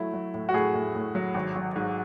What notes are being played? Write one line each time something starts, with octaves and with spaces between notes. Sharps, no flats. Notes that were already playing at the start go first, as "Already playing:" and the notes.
Already playing: F#3 A3 E4
F#3
A2
F#4
A2 G#4
A2
A2
F#3
G#1
F#3
G#2